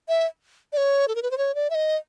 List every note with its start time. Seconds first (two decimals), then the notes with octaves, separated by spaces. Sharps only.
0.09 E5
0.73 D5
0.77 C#5
1.08 A4
1.15 A#4
1.23 B4
1.31 C5
1.38 C#5
1.55 D5
1.70 E5
1.75 D#5